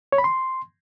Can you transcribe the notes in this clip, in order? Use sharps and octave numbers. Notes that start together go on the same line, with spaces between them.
C#5
B5
C6